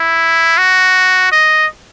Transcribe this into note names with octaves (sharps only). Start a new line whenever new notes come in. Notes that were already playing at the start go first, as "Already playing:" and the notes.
Already playing: E4
F#4
D#5